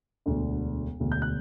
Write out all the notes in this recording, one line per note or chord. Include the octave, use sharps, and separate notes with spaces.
E1 D2 D3
E1 D2 D3
G6
F#6